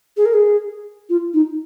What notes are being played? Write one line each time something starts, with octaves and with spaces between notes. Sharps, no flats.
G#4
A#4
G#4
F4
D#4